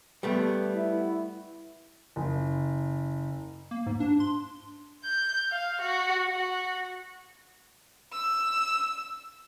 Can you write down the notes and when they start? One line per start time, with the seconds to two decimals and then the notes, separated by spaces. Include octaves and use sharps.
0.23 G3 A3 B3
0.75 E4
2.16 F#1
3.71 A#3
3.86 G#2
4.00 D4
4.20 C6
5.05 G6
5.51 F5
5.82 F#4
6.29 F#4
8.12 E6